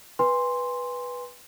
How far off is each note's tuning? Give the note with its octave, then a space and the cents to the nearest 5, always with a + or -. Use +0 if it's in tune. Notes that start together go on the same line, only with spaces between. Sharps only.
B4 -10 G#5 -30 C6 +0